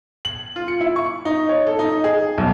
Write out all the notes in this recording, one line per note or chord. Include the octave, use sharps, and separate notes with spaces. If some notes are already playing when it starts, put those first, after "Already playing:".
F#7
F4
C#7
E4
C#6
D#4
C#5
A4
D#4
G#4
B1